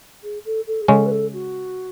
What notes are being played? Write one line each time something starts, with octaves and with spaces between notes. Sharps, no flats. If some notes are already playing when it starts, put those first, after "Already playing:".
G#4
A4
A4
G#4
C#3 G#3 C#4 A4
B4
A4
F#4